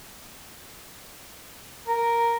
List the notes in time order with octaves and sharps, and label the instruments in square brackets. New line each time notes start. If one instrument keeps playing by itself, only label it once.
[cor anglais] A#4